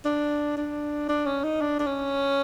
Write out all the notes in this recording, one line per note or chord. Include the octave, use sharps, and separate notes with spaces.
D4
D4
D4
C#4
D#4
D4
D4
C#4